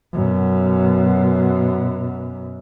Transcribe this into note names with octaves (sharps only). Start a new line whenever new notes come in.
F#2 B2